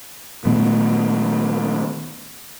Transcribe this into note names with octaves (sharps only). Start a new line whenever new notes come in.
A#2 D#3 A3 B3